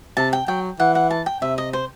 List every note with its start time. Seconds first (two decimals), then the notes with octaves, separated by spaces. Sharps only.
0.17 C3 A5
0.33 G5
0.48 F#3 G5
0.79 E3 F#5
0.95 F#5
1.10 A5
1.26 G5
1.42 C3 E5
1.58 D#5
1.73 C5